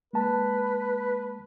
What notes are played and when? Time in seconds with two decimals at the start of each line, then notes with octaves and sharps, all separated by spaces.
0.13 G#3 A#3 B4 A5